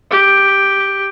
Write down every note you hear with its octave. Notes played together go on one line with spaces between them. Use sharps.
G4